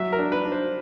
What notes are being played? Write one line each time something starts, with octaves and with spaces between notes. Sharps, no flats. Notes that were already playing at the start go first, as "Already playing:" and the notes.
Already playing: F#3 E5
A#4
D4
B4
D4
C5